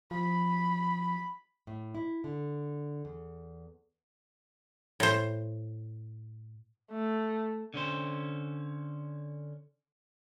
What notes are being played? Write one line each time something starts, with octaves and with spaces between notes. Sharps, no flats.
F3 B5
A2
E4
D3
E2
A2 C5
A3
D3 C#4 C5